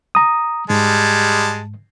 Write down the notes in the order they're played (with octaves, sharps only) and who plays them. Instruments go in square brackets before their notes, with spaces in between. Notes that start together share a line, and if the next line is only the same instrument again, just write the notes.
[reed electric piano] A#5 D#6
[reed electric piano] G#2 [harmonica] G3 G#3 A5